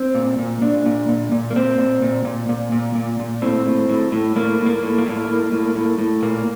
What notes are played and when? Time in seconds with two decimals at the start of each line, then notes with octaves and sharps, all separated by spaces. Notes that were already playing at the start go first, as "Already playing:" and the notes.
Already playing: C4
0.15 A#2
0.38 A#2
0.62 A#2 D4
0.86 A#2
1.09 A#2
1.32 A#2
1.51 A#3
1.56 A#2 C4
1.78 A#2
2.02 A#2
2.25 A#2
2.49 A#2
2.72 A#2
2.95 A#2
3.20 A#2
3.42 A2 C4
3.66 A2
3.89 A2
4.12 A2
4.36 A2 A#3
4.59 A2
4.66 A#3
4.83 A2
4.98 A#3
5.06 A2
5.29 A2
5.52 A2
5.75 A2
5.99 A2
6.23 A#2 A#3